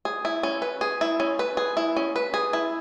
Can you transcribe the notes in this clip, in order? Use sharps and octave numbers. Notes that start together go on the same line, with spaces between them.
G#4
E4
C#4
B4
G#4
E4
C#4
B4
G#4
E4
C#4
B4
G#4
E4